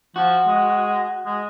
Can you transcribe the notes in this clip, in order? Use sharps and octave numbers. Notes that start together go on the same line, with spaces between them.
F3 F#4
G#3
G#3